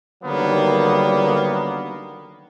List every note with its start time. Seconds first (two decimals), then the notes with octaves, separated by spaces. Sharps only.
0.24 D3 D#3 F#3 G3 A#3 B3